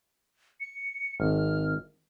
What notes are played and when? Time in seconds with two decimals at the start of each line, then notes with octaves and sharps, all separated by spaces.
0.60 C#7
1.20 G#1 F6